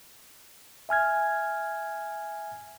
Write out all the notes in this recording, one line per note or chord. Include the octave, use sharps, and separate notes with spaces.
E5 G#5 F6 G#6